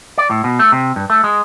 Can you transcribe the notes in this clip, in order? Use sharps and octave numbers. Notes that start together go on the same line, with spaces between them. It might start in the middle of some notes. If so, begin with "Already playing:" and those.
D5
A2
B2
A3
C3
G2
A3
G#3